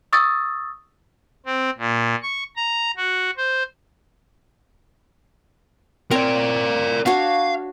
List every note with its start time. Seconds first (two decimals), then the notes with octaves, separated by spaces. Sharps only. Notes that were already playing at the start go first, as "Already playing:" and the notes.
0.13 C#6 D#6 E6 A6
1.46 C4
1.78 A#2
2.23 C#6
2.56 A#5
2.97 F#4
3.37 C5
6.11 C4 A#4 C#5 D5
7.06 D4 F#4 C#5 F5